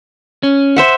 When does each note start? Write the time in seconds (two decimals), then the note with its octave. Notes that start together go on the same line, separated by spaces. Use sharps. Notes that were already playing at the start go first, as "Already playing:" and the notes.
0.43 C#4
0.76 C5 E5 F#5